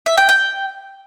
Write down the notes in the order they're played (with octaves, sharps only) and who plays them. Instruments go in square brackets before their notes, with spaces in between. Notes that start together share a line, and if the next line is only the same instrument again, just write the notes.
[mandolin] E5
G5
G5